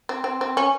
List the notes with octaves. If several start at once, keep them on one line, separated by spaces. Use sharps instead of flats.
C4
C4
C4
C#4